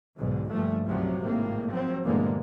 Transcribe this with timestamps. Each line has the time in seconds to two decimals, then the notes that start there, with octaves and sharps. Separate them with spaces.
0.18 B1 G#2 D3
0.51 G1 G2 A#2 F3 A3
0.86 C2 F#2 C3 F3 F#3
1.22 G#1 A2 A#3 C4
1.69 F3 F#3 C4
2.05 E2 G2 A#2 D3 G#3 A#3